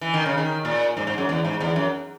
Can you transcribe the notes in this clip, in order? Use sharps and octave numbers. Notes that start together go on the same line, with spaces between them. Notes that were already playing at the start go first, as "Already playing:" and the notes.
E3
D#3
C#3
D#3
A#2
G#2
G#2
F#2
E2
G#2
E2
F#2